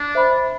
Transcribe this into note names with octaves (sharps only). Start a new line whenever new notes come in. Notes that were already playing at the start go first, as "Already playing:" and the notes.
Already playing: D4
C5 E5 B5